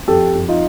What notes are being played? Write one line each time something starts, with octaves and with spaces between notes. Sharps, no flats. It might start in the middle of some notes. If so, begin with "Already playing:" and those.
F2 G4 A4
F2
D#4 F4